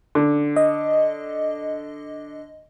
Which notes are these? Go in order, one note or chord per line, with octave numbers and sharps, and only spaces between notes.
D3
D#5